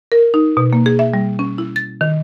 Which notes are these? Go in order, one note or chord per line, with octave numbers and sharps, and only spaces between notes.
A#4
D#4
B2
A#3
G#4
E5
G3
C#4
E4
A6
D#3